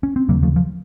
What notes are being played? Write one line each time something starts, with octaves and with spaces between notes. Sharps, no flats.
C#4
C4
D#2 C#3 F#3 A#3
F3 A3
F3